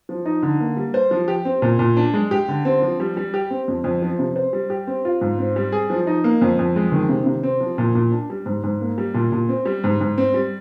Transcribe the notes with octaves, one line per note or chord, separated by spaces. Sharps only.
F3
D#4
D3
A#3
G3
C5
F3
G4
C4
A#2
A#2
D4
G#3
G4
D3
C4
F3
G3
G3
G4
C4
F2
F2
F3
C3
C5
G3
G4
C4
F4
G#2
C4
G3
G#4
F3
D#4
A#3
F2
F2
G#3
D#3
C3
C3
C4
F3
A#2
A#2
D4
G3
G#2
G#2
A#3
G3
A#2
A#2
C4
G3
G#2
G#2
C4
G3